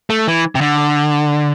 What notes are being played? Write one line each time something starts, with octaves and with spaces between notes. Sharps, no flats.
A3
E3
C3
D3